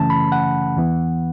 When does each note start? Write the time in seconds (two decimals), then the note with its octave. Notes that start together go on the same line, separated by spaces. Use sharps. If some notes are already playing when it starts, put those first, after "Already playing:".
Already playing: F#2 C#3 E3 A3 C#4 A5
0.10 B5
0.32 F#5
0.77 E2 E3 B3